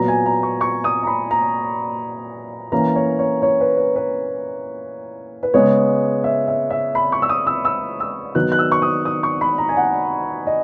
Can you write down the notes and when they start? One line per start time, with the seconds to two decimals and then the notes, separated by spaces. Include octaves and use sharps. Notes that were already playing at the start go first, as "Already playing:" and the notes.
Already playing: A#2 F#3 B3 A#5
0.08 G#5
0.26 A#5
0.43 C#6
0.61 C#6
0.84 D#6
1.03 A#5
1.07 B5
1.31 A#5
2.72 E3 A#3 C#4 A#5
2.96 C#5
3.19 C#5
3.42 C#5
3.60 B4
3.77 B4
3.96 B4
5.43 B4
5.54 C#3 G#3 B3 C#5
6.24 E5
6.48 E5
6.70 E5
6.95 B5
7.12 C#6
7.22 E6
7.29 D#6
7.47 E6
7.65 E6
8.00 E6
8.35 D#3 F#3 B3 F#6
8.52 F#6
8.59 E6
8.72 C#6
8.82 D#6
9.05 D#6
9.23 C#6
9.41 B5
9.58 A#5
9.69 G#5
9.76 F#5
10.47 D#5